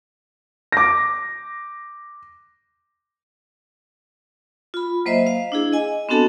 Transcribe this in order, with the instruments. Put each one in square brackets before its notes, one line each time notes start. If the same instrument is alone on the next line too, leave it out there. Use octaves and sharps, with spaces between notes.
[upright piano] D6 A#6
[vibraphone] F4 B5
F#3 A#3 C5 D#5 E5
F5
D4 E4 G#4
D#5 G#5
B3 C4 D4 F#4 A4 A5